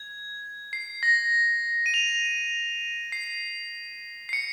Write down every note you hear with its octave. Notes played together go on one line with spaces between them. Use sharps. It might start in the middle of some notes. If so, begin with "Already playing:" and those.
Already playing: G#6
C7
A#6
D#7
F7
C7
C7
C#7